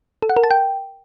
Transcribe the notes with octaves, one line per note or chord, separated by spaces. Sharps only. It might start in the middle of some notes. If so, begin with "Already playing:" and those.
A4
F#5
A#4
A5
G5